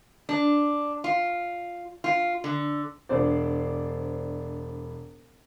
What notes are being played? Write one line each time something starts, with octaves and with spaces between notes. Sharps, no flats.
D4
F4
F4
D3
E1 D4 C5 D5